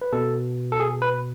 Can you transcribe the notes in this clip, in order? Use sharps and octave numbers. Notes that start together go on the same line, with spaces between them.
B4
B2 A4
A4
G#4
B4